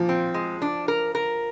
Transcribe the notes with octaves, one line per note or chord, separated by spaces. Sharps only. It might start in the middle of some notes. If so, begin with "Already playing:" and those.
Already playing: A#2 F3
C4
G#3
D4
A#4
A#4